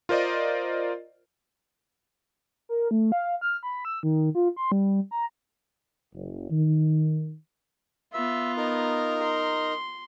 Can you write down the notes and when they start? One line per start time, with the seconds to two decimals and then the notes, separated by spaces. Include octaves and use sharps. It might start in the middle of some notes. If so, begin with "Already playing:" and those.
0.09 F4 A#4 C5 D5 D#5
2.69 A#4
2.91 A3
3.12 F5
3.41 F6
3.63 B5
3.85 E6
4.03 D#3
4.35 F4
4.56 C6
4.72 G3
5.11 A#5
6.13 F#1
6.50 D#3
8.14 B3 F4 E5
8.57 D#4 A#4
9.22 C6